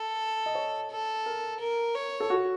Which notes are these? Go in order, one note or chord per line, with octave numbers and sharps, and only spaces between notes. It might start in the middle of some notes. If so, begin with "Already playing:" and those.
Already playing: A4
D#5
C#5
A4
A#4
A#4
C#5
A4
F#4